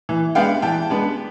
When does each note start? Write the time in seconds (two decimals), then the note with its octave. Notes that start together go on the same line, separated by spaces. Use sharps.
0.09 E3
0.35 G#3 B3 D4 F5 G5
0.62 E3 G5 A5
0.90 G#3 B3 D4